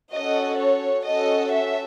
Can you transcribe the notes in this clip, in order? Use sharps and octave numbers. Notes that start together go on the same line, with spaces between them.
C#4 F#4 A4 D#5
C#5
C#4 F#4 A4 D#5
E5